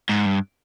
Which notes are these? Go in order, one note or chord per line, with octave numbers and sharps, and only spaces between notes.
G#2
G2